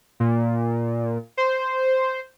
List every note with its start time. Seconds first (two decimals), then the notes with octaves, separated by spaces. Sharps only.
0.20 A#2
1.37 C5